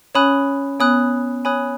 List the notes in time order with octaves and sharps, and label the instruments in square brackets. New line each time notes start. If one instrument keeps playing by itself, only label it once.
[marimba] C#4 [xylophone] C#5 G#5 B5 D#6 F#6
[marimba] B3 [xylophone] C#5 G#5 B5 D#6 F#6
[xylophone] C#5 G#5 B5 D#6 F#6